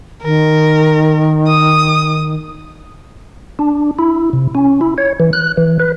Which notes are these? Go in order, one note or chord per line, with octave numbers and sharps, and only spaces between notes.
D#3 A#4
D#6
D4
E4
C3
C#4
E4
C#5
E3
F#6
E3
B4